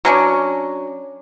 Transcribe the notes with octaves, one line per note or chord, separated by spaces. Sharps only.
F#3 C#4 D4